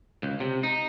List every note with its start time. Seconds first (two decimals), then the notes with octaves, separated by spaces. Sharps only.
0.23 C#2
0.40 C3
0.63 D#4